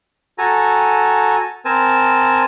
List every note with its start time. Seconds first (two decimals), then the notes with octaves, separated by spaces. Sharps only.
0.38 F#4 A4 G#5 A#5
1.65 C4 A#4 G#5 A5